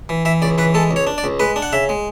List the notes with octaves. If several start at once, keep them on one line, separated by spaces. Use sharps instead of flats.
E3
E3 E5
C#2 D5
E3 B4
G#3 A4
C#2
C#5
D4
D5
C#2
G#3 B4
D4
F#5
C#3 E5
G#3